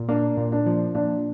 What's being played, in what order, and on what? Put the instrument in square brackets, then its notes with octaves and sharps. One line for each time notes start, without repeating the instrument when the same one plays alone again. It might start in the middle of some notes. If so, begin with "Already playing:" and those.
Already playing: [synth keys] A#2
[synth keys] A#3 [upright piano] D4
[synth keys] A#2
[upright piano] D4
[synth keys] F3
[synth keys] A#2 [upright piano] D4